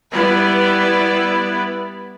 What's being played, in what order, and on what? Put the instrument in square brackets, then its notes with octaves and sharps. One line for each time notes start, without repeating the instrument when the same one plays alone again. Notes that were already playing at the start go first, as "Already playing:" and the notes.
[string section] G3 B3 E4 B4 D5